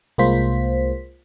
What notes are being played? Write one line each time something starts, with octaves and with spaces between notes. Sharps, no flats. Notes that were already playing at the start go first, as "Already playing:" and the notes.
C2 G#3 A#3 F4 C5 B6